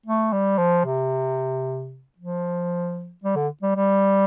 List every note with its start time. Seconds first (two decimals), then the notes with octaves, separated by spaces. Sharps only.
0.06 A3
0.33 G3
0.58 F3
0.85 C3
2.18 F3
3.24 G3
3.36 D3
3.62 G3
3.76 G3